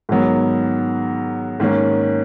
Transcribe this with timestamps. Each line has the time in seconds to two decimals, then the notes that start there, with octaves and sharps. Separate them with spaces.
0.09 G#2 D#3 F#3 B3
1.60 G#2 D#3 A#3 C#4